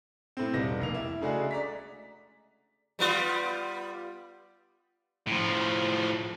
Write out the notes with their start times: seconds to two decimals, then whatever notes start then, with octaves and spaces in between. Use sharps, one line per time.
0.37 A2 C4
0.53 E1 G3 B3 D#4 A#6
0.80 F1 A#3 F7
0.94 E4
1.21 C#3 G#3 A3 D4 F#4 G#4
1.51 D5 A#5 B6
2.99 G3 B3 F4
5.27 A2 F3